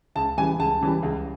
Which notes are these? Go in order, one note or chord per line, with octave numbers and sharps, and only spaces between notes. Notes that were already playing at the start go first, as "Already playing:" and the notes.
C#2 A5
C#3 E3 G3 G#5
C#2 A5
C#3 E3 G3
C#2